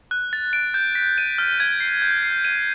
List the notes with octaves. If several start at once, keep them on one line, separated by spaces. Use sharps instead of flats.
F#6
A6
D7
G6
B6
D#7
F6
G#6
C7
G6
C7
D#7